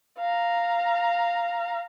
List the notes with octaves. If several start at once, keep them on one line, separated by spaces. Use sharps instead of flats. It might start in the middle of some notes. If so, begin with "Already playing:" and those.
F5 A#5